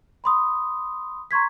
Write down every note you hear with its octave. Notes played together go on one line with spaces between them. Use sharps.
B5 C6 D#6
A#5 C6 C#6 G#6 B6